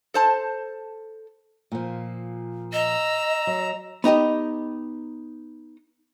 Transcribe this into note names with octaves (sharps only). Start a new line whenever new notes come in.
A4 C5 A5
A#2 F3
D#5 A#5 E6
F#3
B3 D#4 G4 D#5